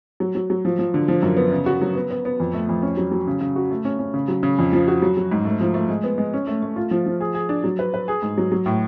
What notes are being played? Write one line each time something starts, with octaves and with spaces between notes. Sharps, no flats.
F#3
F#3
F#3
F3
F3
D3
F3
F#2
B3
C#3
F#4
F#3
B3
B3
B3
F2
A3
F2
C#4
F#3
F#3
C#3
C#3
F#4
A3
C#4
C#4
C#3
F#3
C#3
F2
F3
F#4
F#3
F#3
G#2
A3
F3
A3
G#3
B3
G#3
C#4
A3
A3
F4
F3
F3
G#4
G#4
D4
F#3
B4
B4
G#4
G#2
F#3
F#3
A2